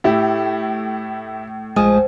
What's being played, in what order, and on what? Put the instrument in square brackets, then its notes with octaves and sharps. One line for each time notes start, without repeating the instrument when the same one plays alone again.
[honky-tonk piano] A2 [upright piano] E4 G4
[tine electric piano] A#1 G#3 D#6 [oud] F3 [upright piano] G#5